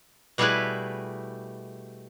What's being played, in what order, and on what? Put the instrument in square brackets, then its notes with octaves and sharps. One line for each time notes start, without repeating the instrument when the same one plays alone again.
[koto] B2 G3 A3 E4 G#4 B4